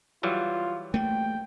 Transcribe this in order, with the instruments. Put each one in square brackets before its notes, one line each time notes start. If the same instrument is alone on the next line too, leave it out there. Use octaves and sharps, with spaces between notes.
[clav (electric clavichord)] E3 F#3 G3 [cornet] F4
[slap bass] A3 A#3 [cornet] G5